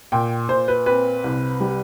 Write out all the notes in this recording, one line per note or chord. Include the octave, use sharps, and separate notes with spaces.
A#2 G5
A#2 C5
B4
C4 B4
C2
G3